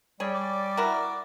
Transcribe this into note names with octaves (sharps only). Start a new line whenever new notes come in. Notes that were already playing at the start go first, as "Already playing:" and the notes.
G3 G#4 C#5
D5
E4 F#4 A#4